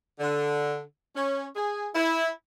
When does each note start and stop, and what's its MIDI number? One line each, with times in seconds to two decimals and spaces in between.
0.19 0.82 50
1.15 1.46 61
1.55 1.88 68
1.95 2.30 64